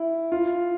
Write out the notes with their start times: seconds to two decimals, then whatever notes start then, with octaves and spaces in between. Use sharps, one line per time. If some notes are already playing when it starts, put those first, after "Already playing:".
Already playing: E4
0.32 F4